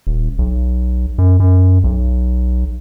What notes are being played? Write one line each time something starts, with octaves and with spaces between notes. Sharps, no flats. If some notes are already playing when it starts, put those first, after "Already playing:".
D#1
B1
F#2
F#2
B1